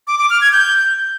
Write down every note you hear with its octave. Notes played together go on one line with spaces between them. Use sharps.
D6
D6
F6
G#6
G6